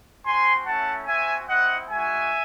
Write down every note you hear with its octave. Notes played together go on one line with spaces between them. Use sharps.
C4 F#4 G#5 C6
A3 C#4 E4 F#5 A5
C4 F#4 E5 G#5
C4 E4 D#5 F#5
G#3 D#4 F#4 E5 G#5